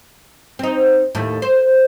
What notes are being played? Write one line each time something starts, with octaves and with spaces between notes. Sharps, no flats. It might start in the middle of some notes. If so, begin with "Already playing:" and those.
C4 D#4
D#2 A2 A3
C5